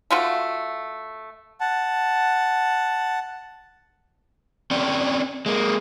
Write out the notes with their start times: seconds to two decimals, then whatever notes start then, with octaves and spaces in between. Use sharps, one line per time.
0.11 A3 F4 F#4
1.61 F#5 A5
4.71 C4 C#4 D5 G5
5.46 G#3 A#3